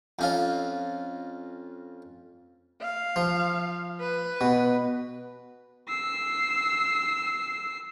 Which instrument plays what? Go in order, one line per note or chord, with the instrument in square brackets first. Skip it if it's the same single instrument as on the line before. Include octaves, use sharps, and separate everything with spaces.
[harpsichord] F2 C#4 F4
[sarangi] F5
[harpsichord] F3
[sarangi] B4
[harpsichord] B2
[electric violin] E6 C7